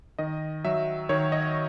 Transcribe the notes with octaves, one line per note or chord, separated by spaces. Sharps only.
D#3 D#5
F#3 E5
D#3 C#5
D#5